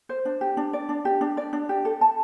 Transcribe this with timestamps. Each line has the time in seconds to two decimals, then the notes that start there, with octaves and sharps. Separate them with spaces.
0.09 C5
0.25 D4
0.41 G4
0.57 D4
0.73 D5
0.89 D4
1.05 G4
1.21 D4
1.37 D5
1.53 D4
1.69 G4
1.85 A4
2.01 A5